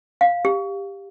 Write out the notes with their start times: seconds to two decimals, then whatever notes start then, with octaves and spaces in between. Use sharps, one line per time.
0.21 F5
0.45 G4